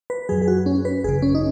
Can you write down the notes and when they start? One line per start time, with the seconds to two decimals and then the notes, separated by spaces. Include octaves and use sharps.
0.10 B4
0.29 F#2 F#3 G#4
0.42 G#4
0.48 F#4
0.66 C#4
0.85 B4
1.04 G#1 F#2 C#3 G#4
1.22 C#4
1.35 D#4